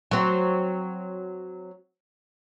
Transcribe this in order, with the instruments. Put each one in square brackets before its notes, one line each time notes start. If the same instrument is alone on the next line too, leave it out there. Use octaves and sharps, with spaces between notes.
[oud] F#3 C4